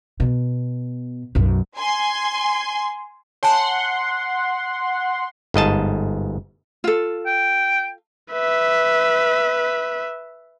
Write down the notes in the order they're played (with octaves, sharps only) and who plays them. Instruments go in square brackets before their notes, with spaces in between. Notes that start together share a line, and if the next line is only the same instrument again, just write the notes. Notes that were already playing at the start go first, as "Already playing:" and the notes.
[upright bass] B2
B1 F#2
[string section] G#5 C6
[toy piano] C#5 G#5 A5 [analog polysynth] F#5 C6
[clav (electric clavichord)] G1 G#2 D#5 A5
[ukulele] F4 A4
[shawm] G5
[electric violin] B4 E5